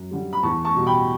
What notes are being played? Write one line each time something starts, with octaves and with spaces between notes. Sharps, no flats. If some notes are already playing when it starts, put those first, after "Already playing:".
Already playing: F#2
D3 G3
B5
E2 A5 C#6
A5 C#6
B2 G3
G5 B5